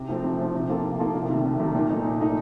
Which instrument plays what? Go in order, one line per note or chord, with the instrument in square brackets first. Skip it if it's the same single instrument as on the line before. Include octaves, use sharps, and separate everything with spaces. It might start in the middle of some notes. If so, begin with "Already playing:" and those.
Already playing: [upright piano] C3
F3 A3 C4
C3
F3 A3 C4
C3
F3 A#3 F4 A4
C3
F3 A#3 F4 A4
C2
C3 D#3 A3
C2
C3 D#3 A3
A#2
A3 D#4
A#2
A3 D#4